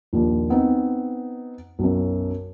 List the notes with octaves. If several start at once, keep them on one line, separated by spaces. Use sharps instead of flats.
A#1 D#2
B3 C4 D#4
B1 F#2